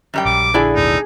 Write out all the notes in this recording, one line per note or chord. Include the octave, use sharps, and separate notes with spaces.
F#2 G3 G5
A#1 D6
D3 D4 E4 G#4 D5
A1 D#2 B2 D#4